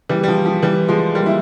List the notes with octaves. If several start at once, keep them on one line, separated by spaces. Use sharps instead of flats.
E3 G3
G3
F3
F3
E3 G3
F3 G#3
G3 A#3
E4